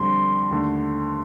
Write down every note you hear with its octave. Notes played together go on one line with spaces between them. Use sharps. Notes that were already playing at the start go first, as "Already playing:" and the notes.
Already playing: F2 D3 G3 C6
D#2 D3 A3